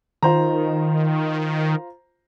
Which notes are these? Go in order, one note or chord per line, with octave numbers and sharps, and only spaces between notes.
D#3 F4 C5 A#5